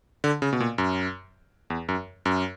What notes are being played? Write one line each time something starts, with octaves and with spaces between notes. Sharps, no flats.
D3
C#3
B2
A#2
F#2
E2
F#2
F#2